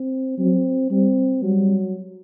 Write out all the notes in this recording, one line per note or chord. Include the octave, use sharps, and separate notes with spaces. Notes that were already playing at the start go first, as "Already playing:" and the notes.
Already playing: C4
F#3 C4
G3 C4
F#3 G3